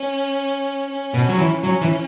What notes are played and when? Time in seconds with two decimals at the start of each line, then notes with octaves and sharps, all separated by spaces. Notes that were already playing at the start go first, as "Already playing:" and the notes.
Already playing: C#4
0.89 C#4
1.14 B2
1.29 F#3
1.39 E3
1.64 F#3 C#4
1.82 E3